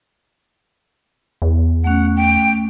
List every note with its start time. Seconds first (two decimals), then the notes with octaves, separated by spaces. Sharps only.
1.42 E2
1.84 A3 C#4 F#5
2.16 G5